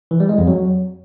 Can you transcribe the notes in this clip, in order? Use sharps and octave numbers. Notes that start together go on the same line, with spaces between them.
E3
G3
G#3
F2
F#3